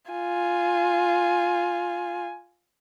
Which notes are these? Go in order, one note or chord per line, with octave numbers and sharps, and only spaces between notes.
F4 G#5